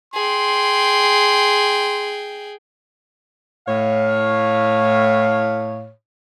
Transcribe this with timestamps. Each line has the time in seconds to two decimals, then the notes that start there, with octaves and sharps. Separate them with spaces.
0.14 G#4 G5 C6
3.68 A2 C#5 F5